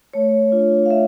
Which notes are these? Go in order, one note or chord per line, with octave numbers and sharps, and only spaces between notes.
A3 C#5
D4 F4
F5
A3 E5